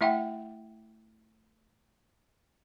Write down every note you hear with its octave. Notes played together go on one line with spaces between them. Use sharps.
A3 E4 E5 F#5 G5